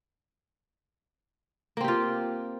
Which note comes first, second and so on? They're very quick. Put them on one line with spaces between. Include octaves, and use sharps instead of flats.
A#3 C4 G4 F4